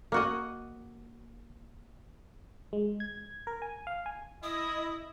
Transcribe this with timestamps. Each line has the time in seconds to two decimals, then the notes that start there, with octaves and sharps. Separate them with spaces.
0.12 A#3 F#4 D#5
2.73 G#3
3.00 G#6
3.47 A#4
3.62 G#5
3.87 F5
4.06 G#5
4.43 E4 D#5 D#6